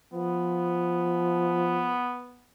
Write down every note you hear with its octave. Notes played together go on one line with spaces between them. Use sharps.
F3 B3